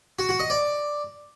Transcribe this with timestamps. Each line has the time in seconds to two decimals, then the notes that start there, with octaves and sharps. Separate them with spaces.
0.19 F#4
0.29 F#4
0.40 D#5
0.50 D5